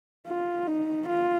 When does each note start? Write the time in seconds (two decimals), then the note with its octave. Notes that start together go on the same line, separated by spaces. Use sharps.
0.27 F4
0.67 D#4
1.08 F4